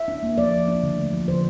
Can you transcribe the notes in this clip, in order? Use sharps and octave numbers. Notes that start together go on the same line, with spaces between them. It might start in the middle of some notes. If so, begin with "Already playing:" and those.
Already playing: E5
D4
A#3
F3 D5
F3
D4
D3
A3
F3
D3 C5